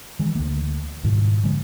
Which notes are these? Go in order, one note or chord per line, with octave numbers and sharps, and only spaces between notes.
D#3 E3 G#3
D2 A#3
G#2 B2 D#3 G3
D3 F3 G#3 A#3